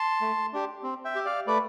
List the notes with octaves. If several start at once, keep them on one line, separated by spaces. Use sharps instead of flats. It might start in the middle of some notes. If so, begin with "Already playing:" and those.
Already playing: A5 C6
A3
D4 G4
C4
E5 G5
G4
D5 F5
A3 B4 D5